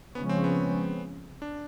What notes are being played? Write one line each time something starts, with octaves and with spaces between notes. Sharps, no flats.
C#3 F3 G#3 B3 C#4
C4
B3
D4